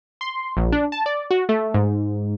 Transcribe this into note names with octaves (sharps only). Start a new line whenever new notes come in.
C6
A#1
D4
A5
D5
F#4
A3
G#2